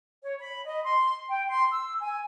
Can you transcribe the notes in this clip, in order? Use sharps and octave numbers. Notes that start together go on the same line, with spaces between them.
C#5
B5
D#5
C6
G5
C6
E6
G#5